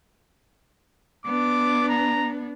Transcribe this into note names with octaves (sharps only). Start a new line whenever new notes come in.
B3 D4 D6
A#5